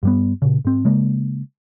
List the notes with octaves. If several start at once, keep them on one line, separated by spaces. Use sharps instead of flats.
G2 G3 B3
A#2 C#3
G#2 C4
C#3 G#3 A#3